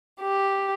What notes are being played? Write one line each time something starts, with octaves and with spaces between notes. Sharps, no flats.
G4